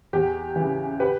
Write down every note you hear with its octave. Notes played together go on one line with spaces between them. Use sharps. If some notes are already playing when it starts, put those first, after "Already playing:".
E2 G4
E3
C#3
G4 B4